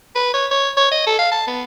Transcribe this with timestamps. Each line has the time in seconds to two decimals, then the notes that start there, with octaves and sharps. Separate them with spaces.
0.15 B4
0.34 C#5
0.51 C#5
0.77 C#5
0.92 D#5
1.07 A4
1.19 F5
1.32 A5
1.47 B3